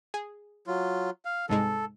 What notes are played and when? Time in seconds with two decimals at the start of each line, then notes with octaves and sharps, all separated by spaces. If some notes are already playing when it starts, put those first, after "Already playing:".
0.14 G#4
0.67 F#3 F4
1.25 F5
1.49 C2 G#2 G#3 A4